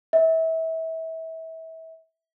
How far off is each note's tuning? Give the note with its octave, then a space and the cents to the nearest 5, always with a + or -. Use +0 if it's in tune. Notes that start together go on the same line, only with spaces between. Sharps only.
E5 -30